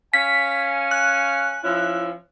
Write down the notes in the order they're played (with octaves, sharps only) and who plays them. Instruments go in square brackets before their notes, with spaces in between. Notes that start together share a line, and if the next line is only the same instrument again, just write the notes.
[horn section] C#4 F5 G#5 [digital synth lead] B6
[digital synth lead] F#6
[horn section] F3 C#4 E4